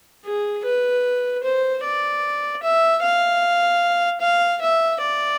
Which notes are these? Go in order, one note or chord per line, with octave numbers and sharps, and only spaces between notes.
G#4
B4
C5
D5
E5
F5
F5
E5
D5